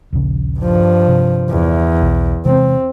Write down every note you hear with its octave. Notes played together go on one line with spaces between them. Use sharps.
D#1 A#1 C#3
G2 F3
C3
E2
B1
C3 E3 G#3 C4